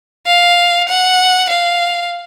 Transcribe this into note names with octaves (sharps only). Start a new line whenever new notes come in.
F5
F#5
F5